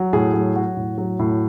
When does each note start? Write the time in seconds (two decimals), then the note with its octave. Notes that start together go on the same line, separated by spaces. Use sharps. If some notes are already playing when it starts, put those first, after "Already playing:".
Already playing: F#3
0.13 A2 G#4
0.34 F#3
0.55 F#3 F#4
0.77 A2
0.98 F#3
1.19 A2